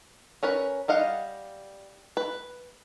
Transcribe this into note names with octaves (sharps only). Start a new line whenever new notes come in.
C#4 A#4 B4
G3 D#5 F5 F#5
B4